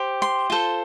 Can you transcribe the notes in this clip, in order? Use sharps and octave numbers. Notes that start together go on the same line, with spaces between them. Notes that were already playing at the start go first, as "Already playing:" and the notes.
Already playing: G4 C5
C6
F4 A4 C5